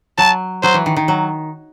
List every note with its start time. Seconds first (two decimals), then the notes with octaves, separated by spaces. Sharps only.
0.18 F#3 A5
0.63 F#3 C5
0.74 E3
0.86 D#3
0.96 D#3
1.08 F#3